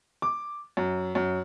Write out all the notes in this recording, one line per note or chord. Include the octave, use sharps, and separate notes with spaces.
D6
F#2
F#2